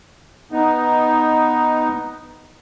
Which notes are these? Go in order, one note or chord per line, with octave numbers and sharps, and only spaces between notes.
B3 D#4